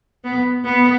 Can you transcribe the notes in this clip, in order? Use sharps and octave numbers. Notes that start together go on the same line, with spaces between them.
B3
B3